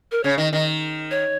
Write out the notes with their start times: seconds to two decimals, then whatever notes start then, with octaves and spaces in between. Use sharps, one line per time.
0.12 A#4
0.23 C#3 C#5
0.38 D#3 D#5
0.52 D#3 D#5
1.11 C#5